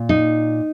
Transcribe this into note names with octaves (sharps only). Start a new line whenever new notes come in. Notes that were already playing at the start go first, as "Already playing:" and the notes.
Already playing: A#2
D#4